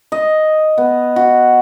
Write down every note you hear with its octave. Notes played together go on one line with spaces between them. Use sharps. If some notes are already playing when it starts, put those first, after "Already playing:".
D#5
B3
F#4